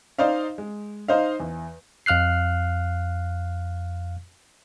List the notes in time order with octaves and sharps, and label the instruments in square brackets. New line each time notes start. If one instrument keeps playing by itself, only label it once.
[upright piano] D#4 C5 D5 D#5 F5
G#3
D#4 C5 D#5 F5
E2
[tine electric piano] F2 F5 F6 F#6 C7